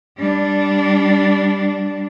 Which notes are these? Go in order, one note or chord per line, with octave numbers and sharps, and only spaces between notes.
G3 D4